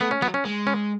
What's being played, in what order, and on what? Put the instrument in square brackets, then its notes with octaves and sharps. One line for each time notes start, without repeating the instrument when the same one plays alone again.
[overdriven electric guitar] A3 [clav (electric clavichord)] B3
[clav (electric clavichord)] C#4
[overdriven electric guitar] F#3 [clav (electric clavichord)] B3
[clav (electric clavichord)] C#4
[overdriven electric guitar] G#3
[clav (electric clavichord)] C#4